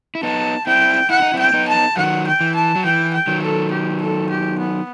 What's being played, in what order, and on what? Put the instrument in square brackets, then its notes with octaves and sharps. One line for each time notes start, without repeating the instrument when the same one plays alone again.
[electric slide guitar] E4
[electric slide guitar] B3 D#4 [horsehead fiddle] A5
[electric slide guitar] C4 E4 [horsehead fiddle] G5
[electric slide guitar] E4 [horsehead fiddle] F#5
[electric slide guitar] D#4
[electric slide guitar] C4 E4 [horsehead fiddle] G5
[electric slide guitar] B3 D#4
[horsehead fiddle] A5
[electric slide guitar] D#3 F#3 [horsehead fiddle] F#5
[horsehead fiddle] G5
[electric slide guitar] E3
[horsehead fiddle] A5
[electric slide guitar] F#3
[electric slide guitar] E3 [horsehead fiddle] G5
[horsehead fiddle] G5
[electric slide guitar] D#3 F#3
[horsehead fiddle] A4
G4
A4
G4
B3